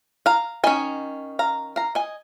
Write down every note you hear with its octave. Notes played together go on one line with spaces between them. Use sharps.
F5 A#5
D#3 C#4 D#5 G#5
F5 A#5
F5 A#5
D#5 G#5